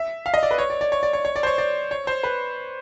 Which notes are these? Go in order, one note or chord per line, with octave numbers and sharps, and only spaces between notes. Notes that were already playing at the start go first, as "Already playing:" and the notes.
Already playing: E5
F5
D#5
D5
B4
C#5
D5
D5
C#5
D5
C#5
C#5
D5
C5
C#5
D5
C#5
C5
B4